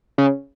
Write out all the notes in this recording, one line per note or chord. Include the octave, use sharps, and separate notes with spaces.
C#3